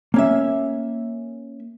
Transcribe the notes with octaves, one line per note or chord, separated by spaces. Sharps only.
A#3 C#4 E5